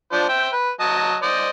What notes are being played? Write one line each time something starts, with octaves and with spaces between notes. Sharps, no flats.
F3 D4 C5
C5 E5 G5
B4
F#3 D#5 A5
C5 D5 D#5